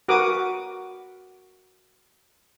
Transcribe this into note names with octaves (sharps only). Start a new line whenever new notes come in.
F#4 A#4 B4 D6 D#6